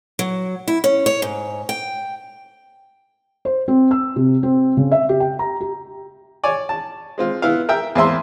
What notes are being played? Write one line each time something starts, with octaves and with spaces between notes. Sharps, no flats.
F#3
E4
C#4
C#5
G#2
G5
C5
C4
E6
C3
C4
C#3
E5
G4
G5
A#5
G4
C#5 D5 G#5
A5
G#3 C4 F4
B3 E4 F5
A#4 E5 G5 E6
E2 A#3 C4 E5 C6